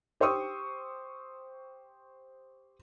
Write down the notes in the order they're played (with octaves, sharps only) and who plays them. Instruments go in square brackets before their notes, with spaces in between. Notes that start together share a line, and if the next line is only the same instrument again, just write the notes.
[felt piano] G4 C5 G5 C#6 D#6 E6